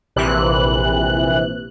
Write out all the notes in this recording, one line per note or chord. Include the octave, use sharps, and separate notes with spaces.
A#1 C3 E3 F#6